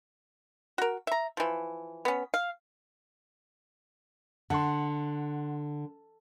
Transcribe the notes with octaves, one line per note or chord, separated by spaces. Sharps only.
F#4 A#4
E5 A#5
E3 F3
B3 C#4
F5
D3 F#5 A5 C6